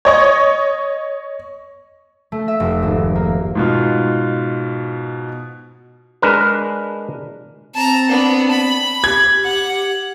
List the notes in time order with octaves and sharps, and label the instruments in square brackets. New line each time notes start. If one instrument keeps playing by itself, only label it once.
[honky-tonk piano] C#5 D#5 C#6
[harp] A3
E5
F1
G#1
A#3
[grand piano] G#2 B2 F4
[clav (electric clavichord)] G#3 D4 A#4 B4
[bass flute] C4 [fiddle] A5 A#5
[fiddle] B3 D4
B5
[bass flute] G4 [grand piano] G#6
[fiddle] F#5